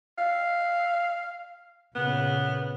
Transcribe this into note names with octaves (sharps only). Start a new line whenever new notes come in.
F5
A#2 C#3 B3